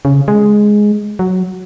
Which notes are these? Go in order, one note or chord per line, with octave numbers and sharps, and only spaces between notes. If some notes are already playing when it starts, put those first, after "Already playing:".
C#3
G#3
F#3